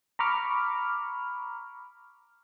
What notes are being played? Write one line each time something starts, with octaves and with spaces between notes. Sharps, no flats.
A#5 B5 C#6 D6 F6